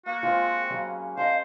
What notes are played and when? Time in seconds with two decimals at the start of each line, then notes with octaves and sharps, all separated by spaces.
0.06 A#3 F#4
0.23 G#3 C4 F4 G#4
0.70 C#3 F#3 C#4 G#4
1.17 C5 D#5 F5 A5